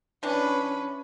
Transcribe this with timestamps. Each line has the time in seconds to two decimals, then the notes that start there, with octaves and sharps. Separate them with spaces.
0.23 E3 C#4 D4 B4